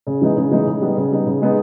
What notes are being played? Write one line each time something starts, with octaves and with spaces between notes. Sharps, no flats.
C#3
E3 G#3 B3 D#4
C#3
E3 G#3 B3 D#4
C#3
G3 B3 D#4
C#3
G3 B3 D#4
C#3
G#3 B3 D#4